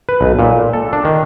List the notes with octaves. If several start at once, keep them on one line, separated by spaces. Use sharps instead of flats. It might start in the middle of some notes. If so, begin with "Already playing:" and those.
B4
B1
A#2
A4
D4
D#3